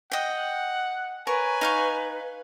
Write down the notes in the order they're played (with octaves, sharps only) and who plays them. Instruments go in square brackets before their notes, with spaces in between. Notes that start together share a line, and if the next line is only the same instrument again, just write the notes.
[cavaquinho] D#5 G5 [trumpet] F#5
[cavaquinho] A#4 C#5 C#6 [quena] B4 [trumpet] G#5
[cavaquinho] D#4 F5 C#6